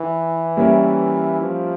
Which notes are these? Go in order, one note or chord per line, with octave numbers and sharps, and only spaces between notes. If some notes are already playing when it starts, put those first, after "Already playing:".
Already playing: E3
G3 A#3 C#4 E4 A#4
F3